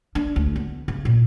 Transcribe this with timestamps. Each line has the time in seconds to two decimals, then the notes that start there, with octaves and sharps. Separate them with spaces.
0.15 D4
0.36 D2
0.56 B3
0.88 C#3
1.05 A#2